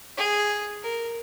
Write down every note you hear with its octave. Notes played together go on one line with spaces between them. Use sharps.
G#4
A#4